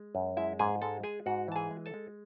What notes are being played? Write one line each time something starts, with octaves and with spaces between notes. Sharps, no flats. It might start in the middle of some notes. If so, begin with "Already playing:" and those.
Already playing: G#3
F#2
G#3 E4 E5
G#2 G#4 G#5
G#3 A4 A5
G#3 G#4 G#5
G#2 F#4 F#5
E3 A5
G#4 G#5
G#3
A4 A5
G#3